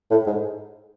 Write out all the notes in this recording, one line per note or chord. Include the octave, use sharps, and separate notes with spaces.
A2
G#2